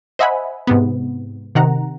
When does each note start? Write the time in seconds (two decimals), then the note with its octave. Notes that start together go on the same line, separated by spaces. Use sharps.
0.19 C5 D#5 E5 F#5 G#5 B5
0.67 G#2 C3 B3
1.55 C3 D#3 F#5 A#5